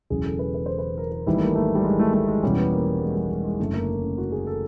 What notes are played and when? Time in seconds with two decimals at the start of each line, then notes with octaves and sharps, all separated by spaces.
0.10 E1 E2 C#3 F#3 G#4
0.25 A4
0.39 B4
0.54 B4
0.66 C5
0.79 B4
0.98 A#4
1.12 A#4
1.26 G#1 G#2 E3 G3 E4
1.37 A3
1.41 A#3
1.55 A3
1.75 G3
1.85 G#3
1.99 A3
2.14 A3
2.28 G#3
2.43 E2 B2 G3 C#4
2.57 B3
2.72 A#3
2.87 A#3
3.01 G#3
3.15 G3
3.23 G#3
3.30 G3
3.45 G#3
3.59 F#1 F#2 D3 A3
3.74 A#3
4.03 C#4
4.18 F#4
4.32 G#4
4.47 A4